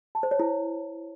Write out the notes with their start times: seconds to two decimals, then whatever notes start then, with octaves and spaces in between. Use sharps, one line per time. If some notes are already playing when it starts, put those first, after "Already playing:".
0.15 A5
0.23 C5
0.31 C#5
0.39 E4